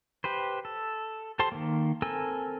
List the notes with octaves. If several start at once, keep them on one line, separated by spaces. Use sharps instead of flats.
G4 B4 C5
A4
G4 A4 C5 A5 C6
D#3 A#3
C4 A4 A#4 G#5 E6